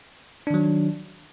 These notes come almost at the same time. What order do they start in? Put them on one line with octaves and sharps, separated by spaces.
D4 D#3 F#3